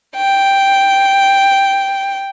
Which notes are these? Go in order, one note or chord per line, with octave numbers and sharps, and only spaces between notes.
G5